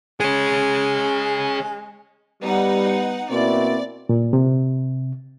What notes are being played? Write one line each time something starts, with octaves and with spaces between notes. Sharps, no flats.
G#3 G#4 C#5
G3 B3 D#4 F#5
B2 A#3 C4 E4 D5
A#2
C3